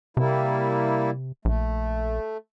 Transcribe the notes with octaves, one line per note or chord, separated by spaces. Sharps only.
C3 G3 A#3 E4
A#1 A3